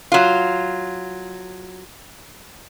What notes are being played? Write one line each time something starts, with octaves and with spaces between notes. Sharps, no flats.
F#3 F4